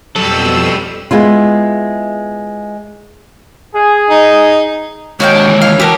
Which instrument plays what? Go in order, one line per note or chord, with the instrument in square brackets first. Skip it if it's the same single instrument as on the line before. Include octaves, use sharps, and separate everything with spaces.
[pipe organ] F2 B2 E6 [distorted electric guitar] F#3 G3 [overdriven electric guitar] A4
[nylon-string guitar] G#3 B3 E4 F4
[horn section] G#4
[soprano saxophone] D#4
[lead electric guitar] D#2 G#3 [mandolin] F#4 F5 G5 [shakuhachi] C#5
[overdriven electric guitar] D4
E3
[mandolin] F5
[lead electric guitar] F#4 A5 [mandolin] G4 A#4